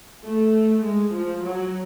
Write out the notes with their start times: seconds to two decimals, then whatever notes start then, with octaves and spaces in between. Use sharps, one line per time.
0.25 A3
0.84 G#3
1.13 F3
1.43 F#3